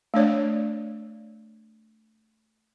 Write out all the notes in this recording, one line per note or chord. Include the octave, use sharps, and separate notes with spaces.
A3 D4 C#5 D5